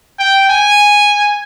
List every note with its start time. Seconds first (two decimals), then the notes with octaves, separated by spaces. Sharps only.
0.19 G5
0.50 G#5